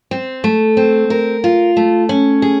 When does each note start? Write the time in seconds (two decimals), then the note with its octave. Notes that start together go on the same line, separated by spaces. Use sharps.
0.11 C4
0.44 A3
0.77 C4
1.10 A#4
1.44 F4
1.77 A3
2.09 C#4
2.42 G#4